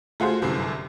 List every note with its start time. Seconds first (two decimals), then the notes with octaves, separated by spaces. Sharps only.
0.20 A3 F4 F#4 G#4 C5
0.42 G1 F#2 C3 E4 C7